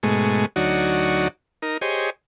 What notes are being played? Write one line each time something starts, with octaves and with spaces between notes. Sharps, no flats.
G#2 B2 G#3 A3 C#6
D2 F#3 D#4 F#4 C#5 D5
D#4 A#4
G4 G#4 C5 C#5 D#5